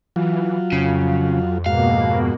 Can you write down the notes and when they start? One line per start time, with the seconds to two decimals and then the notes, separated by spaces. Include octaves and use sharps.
0.16 E3 F#3 F4
0.72 F2 C#3
1.66 G#2 B2 A#3 F#4 F5